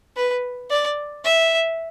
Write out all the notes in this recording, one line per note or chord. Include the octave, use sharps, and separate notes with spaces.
B4
D5
E5